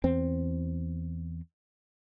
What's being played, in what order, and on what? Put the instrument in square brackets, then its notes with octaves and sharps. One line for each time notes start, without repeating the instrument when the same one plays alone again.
[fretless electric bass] E2 C4